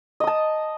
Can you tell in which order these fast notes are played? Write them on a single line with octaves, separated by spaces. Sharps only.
D#5 D#6 A5